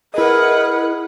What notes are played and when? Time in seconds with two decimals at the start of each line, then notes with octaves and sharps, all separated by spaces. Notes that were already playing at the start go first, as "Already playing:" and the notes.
0.14 E4 G#4 A#4 B4 D#5 F#5